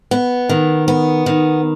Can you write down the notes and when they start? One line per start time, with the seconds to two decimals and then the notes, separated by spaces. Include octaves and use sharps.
0.11 B3
0.49 D#3
0.88 B3
1.26 D#3